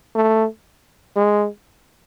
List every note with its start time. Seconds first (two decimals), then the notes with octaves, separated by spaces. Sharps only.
0.15 A3
1.16 G#3